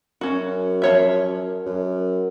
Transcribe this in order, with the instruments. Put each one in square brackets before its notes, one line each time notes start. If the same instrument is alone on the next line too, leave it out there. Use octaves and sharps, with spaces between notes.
[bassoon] F#2 [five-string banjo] C#4 F#4
[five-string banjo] F3 C#5 E5
[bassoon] F#2